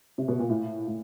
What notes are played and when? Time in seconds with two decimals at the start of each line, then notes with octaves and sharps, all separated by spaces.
0.18 C3
0.28 B2
0.39 A#2
0.50 A2
0.88 A2